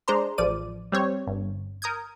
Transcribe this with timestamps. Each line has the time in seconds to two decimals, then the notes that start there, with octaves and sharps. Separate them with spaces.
0.08 G#3 D4 C5 A#5 C6
0.38 A1 F3 D5 D#7
0.92 G3 C4 C#5
1.27 G1
1.82 A#4 D#6 G6 G#6